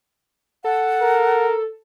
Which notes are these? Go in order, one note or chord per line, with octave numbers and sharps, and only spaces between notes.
A4 F#5
A#4